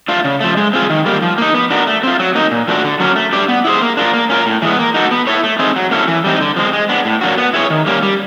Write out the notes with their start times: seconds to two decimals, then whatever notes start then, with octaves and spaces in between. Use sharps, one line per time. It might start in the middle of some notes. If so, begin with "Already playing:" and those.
0.08 A3 D4 F4
0.24 C#3
0.41 F3 A3
0.57 G#3
0.73 C4 F4 G#4
0.90 D#3
1.06 G3 A#3
1.22 F3
1.38 A#3 D#4
1.54 B3
1.70 D4 F#4 A#4
1.87 A3
2.03 C4 F4
2.19 F#3
2.35 A#3 D#4
2.51 A#2
2.68 F3 A3 D4 F#4
2.84 D3
3.00 F#3 A#3 C#4
3.16 A3
3.33 D4 G4 B4 D5
3.48 B3
3.64 E4 G#4 C5
3.81 A#3
3.97 D4 F4 A#4
4.14 A#3
4.30 C#4 F4 A#4
4.46 A2
4.62 E3 G#3 B3
4.79 A#3
4.94 D#4 F#4 A4
5.11 B3
5.27 E4 A4 C#5
5.44 A3
5.59 C4 D#4 G#4
5.76 F#3
5.91 A#3 C#4 E4 A4
6.08 E3
6.24 G3 C4 D#4
6.41 D3
6.56 F3 G#3 C4
6.73 G#3
6.89 B3 D4
7.05 A2
7.21 F#3 A#3 D4 F#4
7.38 B3
7.54 E4 G#4 C#5
7.70 D#3
7.87 G3 A#3 C#4
8.03 G3